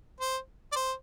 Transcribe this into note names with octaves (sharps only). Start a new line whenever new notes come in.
C5
D5
C5